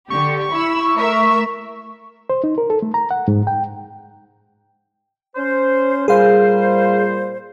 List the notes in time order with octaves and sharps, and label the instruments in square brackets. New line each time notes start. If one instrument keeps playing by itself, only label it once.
[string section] D3 G4 [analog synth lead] C#6
[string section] E4 B5 E6
A3 A#4 E5
[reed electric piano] C5
D#4
A#4
A4
A3
A#5
F#5
G#2
G5
[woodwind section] C#4 C5
[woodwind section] A#2 G3 C5 [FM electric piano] G#4 F5